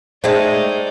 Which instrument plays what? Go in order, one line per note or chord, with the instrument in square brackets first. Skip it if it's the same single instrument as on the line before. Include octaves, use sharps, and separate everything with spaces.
[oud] G#3 A3 [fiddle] D#4 D5 [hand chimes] C5 E5 G5